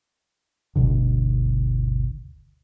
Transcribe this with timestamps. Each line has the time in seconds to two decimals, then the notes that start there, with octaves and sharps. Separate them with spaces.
0.76 G1 D2 B2 D3